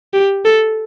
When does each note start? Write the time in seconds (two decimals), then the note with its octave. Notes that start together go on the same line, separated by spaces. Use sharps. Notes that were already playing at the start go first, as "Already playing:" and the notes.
0.13 G4
0.45 A4